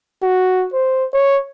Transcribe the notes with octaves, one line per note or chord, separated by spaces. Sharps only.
F#4
C5
C#5